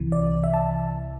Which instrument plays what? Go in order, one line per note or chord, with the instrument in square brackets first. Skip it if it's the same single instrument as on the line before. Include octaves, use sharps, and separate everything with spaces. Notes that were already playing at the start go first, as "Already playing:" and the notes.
Already playing: [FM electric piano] C2 C3 E3
D5
E5
A5